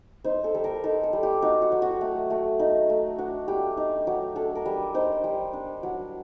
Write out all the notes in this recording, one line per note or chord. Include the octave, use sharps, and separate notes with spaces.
D#4 C5
A4
G3 A4
A#4
D#4 A4
A4
G3
G4
D#4 F#4
F#4
F#3
F#4
A3
A3
D#4
A3
D4 F#4
G3 G4
D#4
F#3
D4 A4
A#4
G3
D#4 C5
G3
D4
F#3